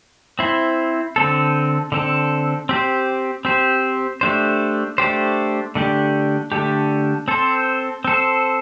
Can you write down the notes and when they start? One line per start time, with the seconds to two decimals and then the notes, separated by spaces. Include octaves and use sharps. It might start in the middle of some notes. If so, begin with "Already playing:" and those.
0.39 C4 E4 C5
1.16 D3 C4 A4
1.92 D3 C4 A4
2.69 C4 G4 C5
3.45 C4 G4 C5
4.21 A3 D4 G4 C5
4.98 A3 D4 G4 C5
5.75 D3 A3 D4 G4
6.52 D3 A3 D4 G4
7.28 C4 A4 C5
8.04 C4 A4 C5